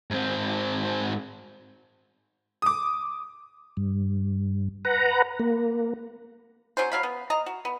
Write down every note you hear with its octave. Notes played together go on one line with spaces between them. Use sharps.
G#2 C4
D6 D#6
G2
B4 F#5 A#5
A#3
F#3 C#4 C5
F#3 F5 B5
B3
D#5 A#5
F#4
B3